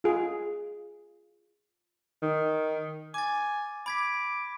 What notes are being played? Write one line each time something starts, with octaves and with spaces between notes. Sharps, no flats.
F4 G#4
D#3
G#5 D6 A6
B5 D6 G#6 B6